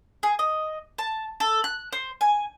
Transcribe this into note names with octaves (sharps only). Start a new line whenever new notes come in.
G#4
D#5
A5
A4
F#6
C5
G#5